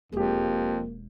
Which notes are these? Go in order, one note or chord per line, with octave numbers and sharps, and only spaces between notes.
E1 F2 G#3 A#3 G4 G#4